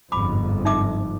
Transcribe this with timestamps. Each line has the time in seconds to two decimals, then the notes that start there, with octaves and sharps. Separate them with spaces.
0.12 G1 F2 G#2 B5 D6
0.65 D#4 E5 D6